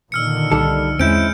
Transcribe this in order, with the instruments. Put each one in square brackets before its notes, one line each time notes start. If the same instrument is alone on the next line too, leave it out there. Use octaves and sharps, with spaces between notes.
[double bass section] A#2 D3 D#3 [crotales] E6 F6 C#7
[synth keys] C2 D#4 D5 [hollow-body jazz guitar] G3 A4
[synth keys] E2 [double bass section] G#3 [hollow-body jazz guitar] C4 C#4 E4 [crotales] G6 D7